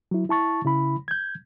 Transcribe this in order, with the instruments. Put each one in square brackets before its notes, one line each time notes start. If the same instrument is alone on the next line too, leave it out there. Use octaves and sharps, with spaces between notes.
[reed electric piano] F#3 E4
E4 A5 C#6 A6
C#3 E4 B5
G6 G#6